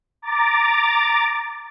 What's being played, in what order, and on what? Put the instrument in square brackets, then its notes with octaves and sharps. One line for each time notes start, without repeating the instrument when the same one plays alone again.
[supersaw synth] A#5 D6 A6